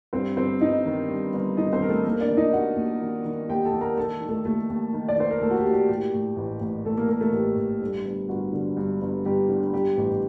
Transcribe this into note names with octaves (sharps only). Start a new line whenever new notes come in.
G2 C4 C5
G1 C4 C5
G1 D#4 D#5
D#3
G2
G1
G1 D#4 D#5
C4 C5
D#3 A#4
A3 A4
D#3 A#3 A#4
D4 D5
D#3
D#4 D#5
D#2 F#4 F#5
D#2
D#3
D#3
D#2 G4 G5
A4 A5
D#2
A#4 A#5
D#3 A4 A5
D#3
A3 A4
D#2 A3 A4
D#2
D#3
D5
D#3 C5
A#4
D#2 A3 A4
F#4
G4
D#2
G4
A2 G4
A2
A1
A1
A2 A3 A4
A#3 A#4
A2 A#3 A#4
A3 A4
A1 G4
A1
G2
G1
G1 F#4
D3
G2
G1
G1 G4
D3
G2 G4
A1